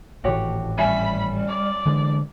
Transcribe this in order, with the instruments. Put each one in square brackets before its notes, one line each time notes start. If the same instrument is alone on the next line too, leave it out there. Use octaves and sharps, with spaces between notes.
[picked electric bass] G#1 A2 E3 [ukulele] F#4 G4 C#5
[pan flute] G3 [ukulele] C#4 E5 G#5 [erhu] B5
[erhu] D5
[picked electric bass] D3 E3 G#3